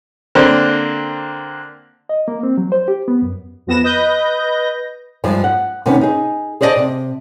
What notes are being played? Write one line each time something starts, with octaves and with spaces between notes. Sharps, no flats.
D3 A#3 C4 D4 C5
D#5
A#3
C4
F#3
C5
G4
B3
F#2
F2 F3 B3 A#6 E7
B4 D#5 G6 A#6
G2 F3 G#3
F#5
C3 D#3 B3 C#4
D#4 G#4
G#4 C5 D5 D#5 F5 A5
C3